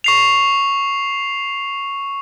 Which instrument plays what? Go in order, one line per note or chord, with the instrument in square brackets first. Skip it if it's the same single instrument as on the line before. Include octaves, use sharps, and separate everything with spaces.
[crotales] C#6 C7 F7